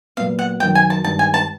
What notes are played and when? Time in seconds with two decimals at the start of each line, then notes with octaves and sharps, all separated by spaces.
0.17 A#2 F#3 B3 F5
0.39 F#5
0.60 F#2 D#3 F#3 G5
0.75 G#5
0.90 A5
1.04 G2 D#3 G#3 A5
1.19 G#5
1.34 A5